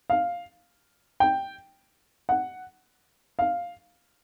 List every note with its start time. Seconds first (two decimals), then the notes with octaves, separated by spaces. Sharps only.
0.10 F5
1.20 G5
2.29 F#5
3.39 F5